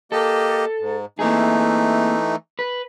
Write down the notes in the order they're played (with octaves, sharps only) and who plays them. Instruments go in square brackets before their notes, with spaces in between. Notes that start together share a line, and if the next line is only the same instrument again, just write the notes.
[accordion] A#3 G4 D#5 [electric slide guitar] A4
[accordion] G#2
[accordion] E3 A3 D#4 [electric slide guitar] A#3 C4 G#4
[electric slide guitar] B4